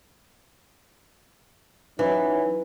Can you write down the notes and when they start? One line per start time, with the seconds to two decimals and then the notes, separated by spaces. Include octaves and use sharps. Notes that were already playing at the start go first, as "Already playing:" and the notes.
1.99 E3 F#3 C#4 D#4